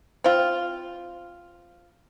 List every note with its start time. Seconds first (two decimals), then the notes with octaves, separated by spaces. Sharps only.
0.24 C4 F4